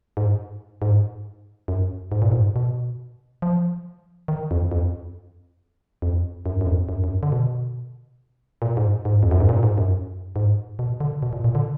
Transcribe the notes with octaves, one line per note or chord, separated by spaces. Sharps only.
G#2
G#2
F#2
G#2
A#2
G#2
B2
F3
D#3
F2
F2
F2
F#2
F#2
F2
F#2
F#2
D3
B2
A#2
G#2
G#2
F2
F#2
G#2
A#2
G#2
F#2
G#2
B2
D3
B2
A#2
A#2
D3